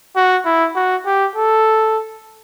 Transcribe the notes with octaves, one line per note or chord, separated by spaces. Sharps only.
F#4
E4
F#4
G4
A4